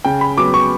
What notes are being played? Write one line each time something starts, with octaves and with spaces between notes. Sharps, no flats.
C#3 G5
B5
F#3 B3 D6
C#6